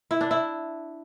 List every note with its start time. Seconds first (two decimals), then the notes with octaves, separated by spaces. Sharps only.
0.11 E4
0.21 D4
0.31 E4